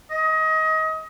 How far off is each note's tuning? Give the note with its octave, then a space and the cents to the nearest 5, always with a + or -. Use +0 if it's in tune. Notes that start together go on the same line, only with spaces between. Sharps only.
D#5 +25